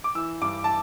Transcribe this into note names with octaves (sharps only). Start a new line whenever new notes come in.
D6
E3 E6
G2 D6
A5